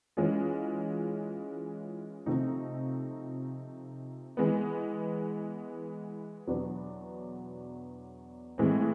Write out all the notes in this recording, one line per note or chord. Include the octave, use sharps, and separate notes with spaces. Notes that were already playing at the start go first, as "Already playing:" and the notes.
E3 G#3 C#4 F4 G#4
C3 F3 A3 C4 D#4
E3 G#3 B3
E2 B2 F#3 B3 D4
A2 E3 G#3 C4